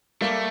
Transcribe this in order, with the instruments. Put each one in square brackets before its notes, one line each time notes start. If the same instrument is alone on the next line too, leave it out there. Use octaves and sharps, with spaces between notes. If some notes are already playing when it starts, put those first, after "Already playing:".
[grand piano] G3 A#3 [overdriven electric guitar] A3